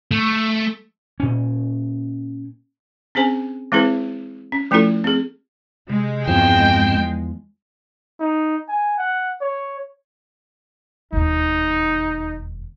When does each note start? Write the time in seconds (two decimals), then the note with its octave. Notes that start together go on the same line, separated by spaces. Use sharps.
0.11 A3
1.20 A#2 C#4
3.15 C4 C#4 G#4 C5 G#5
3.72 E3 G#3 C4 E4 G#4 B4
4.52 C#4
4.71 F3 A3 C#4 E4 F4 A4
5.04 C4 G#4
5.89 C3 G#3
6.27 E2 G2 F3 C4 G5
8.20 D#4
8.69 G#5
8.98 F#5
9.41 C#5
11.13 E1 D#2 D#4